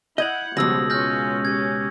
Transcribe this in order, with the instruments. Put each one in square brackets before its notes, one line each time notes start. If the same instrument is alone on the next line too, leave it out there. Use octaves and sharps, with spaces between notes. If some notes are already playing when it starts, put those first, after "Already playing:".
[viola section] E4 F#5 [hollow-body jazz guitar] D#5 [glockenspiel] G6 G#6 F#7
[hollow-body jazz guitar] C#2 B2 [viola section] F3 G3 F#4 [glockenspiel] D#6 E6 A#6
[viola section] G#3 C#4 F4 [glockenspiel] F6 G6 A#6
[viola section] C#4 G4 [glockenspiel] G#6